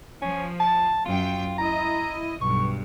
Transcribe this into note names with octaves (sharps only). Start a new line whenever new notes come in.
F3 C#4
A5
F#2 F4 G5
E4 D#5 A#5
B1 G2 C#6